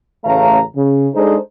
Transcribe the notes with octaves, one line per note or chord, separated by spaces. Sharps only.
A1 C#3 A3 F5 A#5
C#3
G#3 D4 D#4 G#4 A4 C5